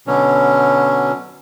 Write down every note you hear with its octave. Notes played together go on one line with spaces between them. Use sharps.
B2 D3 F#3 C#4